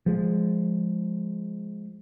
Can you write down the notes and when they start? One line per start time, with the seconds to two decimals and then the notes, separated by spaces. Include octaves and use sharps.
0.06 F3 G#3